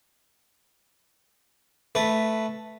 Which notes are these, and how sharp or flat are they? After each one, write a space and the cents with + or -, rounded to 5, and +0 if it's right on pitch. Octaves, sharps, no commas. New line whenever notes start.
A3 +0 B4 +0